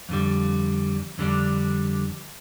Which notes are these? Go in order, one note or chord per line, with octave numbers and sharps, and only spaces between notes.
F2 D3 G3
F2 D3 G3 D4